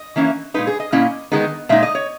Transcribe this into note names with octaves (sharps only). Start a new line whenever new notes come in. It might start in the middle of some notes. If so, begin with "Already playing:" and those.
Already playing: D#5
E3 A#3 C#4 E4
A#2 G#3 D#4 B4
G#4
D#5
A#2 A#3 C#4 E4 D#5
D#3 G#3 B3 D#4
A#2 G#3 D#4 E5
D#5
C#5